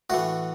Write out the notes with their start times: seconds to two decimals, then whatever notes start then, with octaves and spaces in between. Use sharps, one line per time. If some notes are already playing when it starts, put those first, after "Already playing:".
0.10 A2 E3 F#4